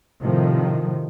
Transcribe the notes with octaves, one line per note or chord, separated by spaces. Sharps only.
A2 C3 D#3 F3